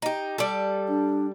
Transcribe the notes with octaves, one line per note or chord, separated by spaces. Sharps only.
D#4 G4
G3 A4
D4